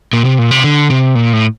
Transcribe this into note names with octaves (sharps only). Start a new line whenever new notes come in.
A#2
C3
A#2
C3
D3
C3
A#2
A2